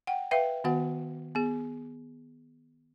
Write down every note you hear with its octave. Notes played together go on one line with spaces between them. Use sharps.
F#5 G5
B4 E5 F5 G5
D#3 B3 F#4 F#5
B3 G#4